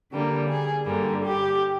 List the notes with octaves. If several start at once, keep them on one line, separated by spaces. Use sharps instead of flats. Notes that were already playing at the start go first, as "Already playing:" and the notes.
D3 G3 A#3
G#4
G2 D3 G3 A#3
G4